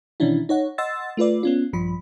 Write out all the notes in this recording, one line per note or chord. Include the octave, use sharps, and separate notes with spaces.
B2 D#3 E3 C#4 D4 E4
D#4 C#5 F#5
D#5 F#5 C6 E6 A6
A3 F4 B4 D5
B3 C#4 F4
A#1 G2 F3 B5